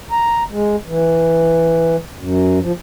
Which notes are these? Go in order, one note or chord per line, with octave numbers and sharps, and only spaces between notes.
A#5
G#3
E3
F#2
F3